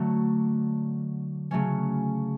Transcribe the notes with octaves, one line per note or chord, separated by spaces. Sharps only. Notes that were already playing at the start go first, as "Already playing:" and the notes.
Already playing: D3 F#3 A3
C#3 F#3 A3 C#4